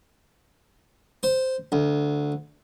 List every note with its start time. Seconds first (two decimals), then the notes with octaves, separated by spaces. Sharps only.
1.23 C5
1.72 D2